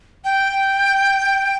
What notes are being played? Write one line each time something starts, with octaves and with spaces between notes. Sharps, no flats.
G5